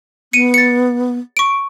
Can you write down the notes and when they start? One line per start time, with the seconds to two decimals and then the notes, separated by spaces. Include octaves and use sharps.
0.33 B3 C#7 D#7
0.54 A6 C#7
1.37 C#6 D7